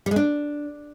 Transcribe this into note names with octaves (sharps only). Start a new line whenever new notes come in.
G3
G#3
D4